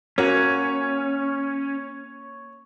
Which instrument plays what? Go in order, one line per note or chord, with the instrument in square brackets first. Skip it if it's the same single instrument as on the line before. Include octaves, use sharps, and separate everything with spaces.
[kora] A#3 F#4 [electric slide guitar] C#4 [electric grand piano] C#5